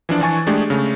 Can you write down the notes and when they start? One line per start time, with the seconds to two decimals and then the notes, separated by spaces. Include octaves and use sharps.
0.09 E3 F3 D4 D5
0.21 E3 D4 G#5 C#6 A6
0.47 G#3 A3 D4 G4 G#4
0.70 C#3 A3